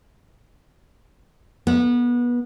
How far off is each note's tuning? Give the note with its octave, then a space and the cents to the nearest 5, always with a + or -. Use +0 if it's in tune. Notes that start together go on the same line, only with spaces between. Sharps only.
B3 -25